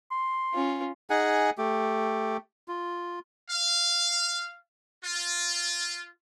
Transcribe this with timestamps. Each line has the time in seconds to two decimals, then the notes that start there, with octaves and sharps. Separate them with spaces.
0.11 C6
0.54 C#4 F4
1.10 D#4 G#4 F#5 G#5
1.58 A3 G4
2.68 F4
3.50 F5
5.04 F4